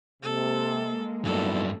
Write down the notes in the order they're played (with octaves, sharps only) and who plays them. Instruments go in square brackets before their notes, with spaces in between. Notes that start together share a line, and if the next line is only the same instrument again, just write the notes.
[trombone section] C3 [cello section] G#3 A#3 [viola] A4
[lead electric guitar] G2 F#3 [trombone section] B3 D#4 E4 [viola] A4